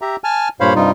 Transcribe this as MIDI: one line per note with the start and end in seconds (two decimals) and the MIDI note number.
0.02 0.16 67
0.02 0.16 76
0.02 0.16 82
0.24 0.49 80
0.24 0.49 81
0.24 0.49 89
0.60 0.74 43
0.60 0.74 46
0.60 0.74 72
0.60 0.74 73
0.60 0.74 77
0.60 0.74 83
0.75 0.91 43
0.75 0.91 48
0.75 0.91 55
0.75 0.91 63
0.75 0.91 65